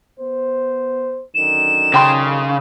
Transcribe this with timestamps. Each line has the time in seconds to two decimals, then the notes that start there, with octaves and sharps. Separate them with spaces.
0.17 B3 C5
1.35 F#2 D3 D#3 E7
1.94 C#3 G5 C6